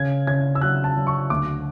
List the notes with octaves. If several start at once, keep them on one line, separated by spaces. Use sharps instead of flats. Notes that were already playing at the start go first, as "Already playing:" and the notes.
Already playing: C#3 G#6
C#3 G#6
E6
F#3 F#6
A5
F#3
C#6
D2 D6